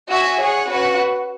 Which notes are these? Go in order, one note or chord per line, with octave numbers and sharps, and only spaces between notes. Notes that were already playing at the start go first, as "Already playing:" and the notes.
F#4 E5 G#5
G#4 C#5 F#5
C#4 F#4 B4 F#5